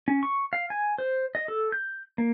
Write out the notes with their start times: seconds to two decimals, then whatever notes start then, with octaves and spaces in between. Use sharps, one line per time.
0.08 C#4
0.23 C#6
0.53 F5
0.70 G#5
0.98 C5
1.35 D#5
1.48 A4
1.72 G6
2.18 A#3